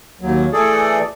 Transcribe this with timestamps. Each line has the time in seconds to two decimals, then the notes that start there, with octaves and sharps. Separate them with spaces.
0.21 D#2 F#3
0.53 E3 A3 G#4 A4 D5